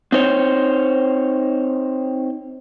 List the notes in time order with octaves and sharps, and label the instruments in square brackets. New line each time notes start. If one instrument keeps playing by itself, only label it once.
[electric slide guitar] C4 D#4 C5 C#5